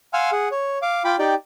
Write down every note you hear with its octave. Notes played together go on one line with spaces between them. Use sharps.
F5 F#5 G#5 C6 E6 F6
G#4 F#5
C#5
F5 D6
F4 G5 B5 D6
D#4 G4 D5 G5